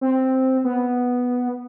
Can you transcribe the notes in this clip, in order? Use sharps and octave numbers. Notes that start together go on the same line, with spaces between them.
C4
B3